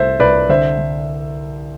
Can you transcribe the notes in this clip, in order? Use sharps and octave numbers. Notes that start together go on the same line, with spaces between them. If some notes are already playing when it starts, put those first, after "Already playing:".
Already playing: C2 A3 A4 C5 E5
C2 B4 D5
D3 C5 E5
D3